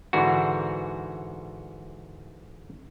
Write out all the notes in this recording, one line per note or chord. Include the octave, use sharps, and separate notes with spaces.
G#2 D3 E3 F#4